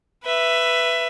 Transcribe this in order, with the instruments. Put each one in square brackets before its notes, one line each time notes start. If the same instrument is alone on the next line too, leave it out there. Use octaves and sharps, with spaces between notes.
[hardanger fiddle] B4 E5